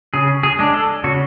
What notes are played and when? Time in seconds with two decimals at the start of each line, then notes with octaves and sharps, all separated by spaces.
0.14 C#3 G#4
0.43 G#4
0.59 G#3 D4
0.74 A4
1.04 C#3 F#4